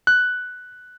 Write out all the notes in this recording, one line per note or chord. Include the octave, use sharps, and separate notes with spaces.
F#6